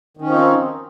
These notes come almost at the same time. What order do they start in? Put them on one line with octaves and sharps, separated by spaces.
D#3 C#4 F3 D#4 C4